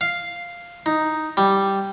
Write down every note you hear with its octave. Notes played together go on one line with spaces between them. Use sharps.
F5
D#4
G3